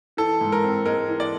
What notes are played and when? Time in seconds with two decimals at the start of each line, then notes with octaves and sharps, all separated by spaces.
0.17 E3 A4
0.41 G#2
0.52 A#4
0.64 C4
0.86 G#3 A#4
1.08 E3
1.20 D5